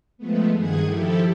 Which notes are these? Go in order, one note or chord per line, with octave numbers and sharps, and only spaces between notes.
F3 G#3 A3 B3
G2 D#3 G#4 F#5 G#6
F3 E4 G4 A4